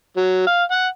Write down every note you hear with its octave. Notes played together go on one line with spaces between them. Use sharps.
F#3
F5
F#5